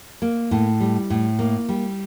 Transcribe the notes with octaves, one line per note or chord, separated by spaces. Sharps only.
A#3
A2
G3
A2
A#3
G3